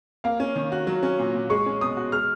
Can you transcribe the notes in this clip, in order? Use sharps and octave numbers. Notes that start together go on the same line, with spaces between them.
A#3 F5
C#4
D#3
F#4
F#3
C#4
A#2
A#2
G#3 C#6
C#4
B2 D#6
F#4
G#3 F6